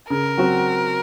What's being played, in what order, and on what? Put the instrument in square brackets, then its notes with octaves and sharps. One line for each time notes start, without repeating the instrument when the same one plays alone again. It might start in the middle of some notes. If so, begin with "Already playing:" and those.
[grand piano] C#3 [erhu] A#4
[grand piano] F#3 C4 F#4